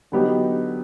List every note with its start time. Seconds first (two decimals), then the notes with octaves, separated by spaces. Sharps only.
0.12 D3 F#3 B3 D#4 G4